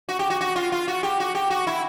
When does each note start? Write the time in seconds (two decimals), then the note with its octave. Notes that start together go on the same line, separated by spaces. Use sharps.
0.09 F#4
0.19 G4
0.30 F#4
0.41 F#4
0.56 F4
0.72 F4
0.88 F#4
1.03 G4
1.20 F#4
1.35 G4
1.50 F#4
1.67 E4